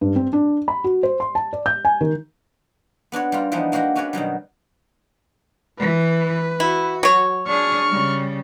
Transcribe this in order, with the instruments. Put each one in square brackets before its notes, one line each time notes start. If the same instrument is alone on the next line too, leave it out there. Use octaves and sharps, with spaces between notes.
[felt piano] G2
C4
D4
B5
F#4
C5
C6
A5
D5
G6
G#5
D#3
[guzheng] B3 D4 F#4 C#5
G3 A#3 F4
E3 F3 G3 B3 D4 D#4
G#3 A#3 F#4 G4 F#5
C#4 D4 F#4 B4 C#5 D5
B2 D#3 F#3 G3
[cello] E3 [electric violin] B4
[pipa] E4 [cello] F#4
[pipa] F#3 C#5
[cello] D4 G#4 [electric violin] C#6 F6
[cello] C#3 G3